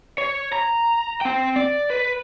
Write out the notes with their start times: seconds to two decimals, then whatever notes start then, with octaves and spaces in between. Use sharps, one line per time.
0.18 C#5
0.53 A#5
1.21 C4 G5
1.56 D5
1.90 B4